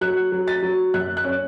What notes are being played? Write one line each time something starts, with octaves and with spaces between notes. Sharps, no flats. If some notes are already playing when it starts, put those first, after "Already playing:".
F#3 F#6
F#3
A6
F#3
F#2 F#6
F#6
C#4